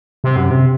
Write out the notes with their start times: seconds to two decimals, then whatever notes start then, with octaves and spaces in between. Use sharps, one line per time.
0.24 C3
0.36 F#2
0.51 C3